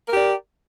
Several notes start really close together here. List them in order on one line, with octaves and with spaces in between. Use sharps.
A#4 G4 D5